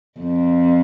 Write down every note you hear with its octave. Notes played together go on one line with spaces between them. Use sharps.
F2